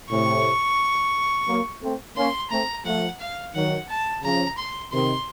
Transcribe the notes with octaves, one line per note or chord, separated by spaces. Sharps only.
A2 C3 C#6
F#3 A#3
A3 C4
A#3 C#4 C6
A3 C4 A#5
F3 A3 F#5
F5
D#3 F#3 F#5
A5
C#3 F3 A#5
C6
C3 D#3 C6